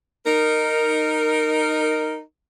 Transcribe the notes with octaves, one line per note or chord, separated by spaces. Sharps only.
D#4 A#4